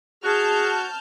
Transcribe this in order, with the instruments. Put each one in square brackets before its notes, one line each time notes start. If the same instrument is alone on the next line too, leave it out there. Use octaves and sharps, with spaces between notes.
[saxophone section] F#4 [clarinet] G#4 [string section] A5 F6 G6